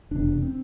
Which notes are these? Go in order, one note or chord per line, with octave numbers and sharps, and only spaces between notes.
F1 E2 C3 D4
C4